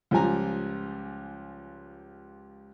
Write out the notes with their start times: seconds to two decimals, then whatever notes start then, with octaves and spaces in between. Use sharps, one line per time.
0.11 C#2 F3 G3 G#5 A#5